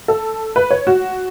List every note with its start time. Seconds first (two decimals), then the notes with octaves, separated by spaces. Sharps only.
0.08 A4
0.56 B4
0.71 C#5
0.87 F#4